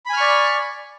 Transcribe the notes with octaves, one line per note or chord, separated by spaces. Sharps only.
D5 G#5 B5 C#6 F6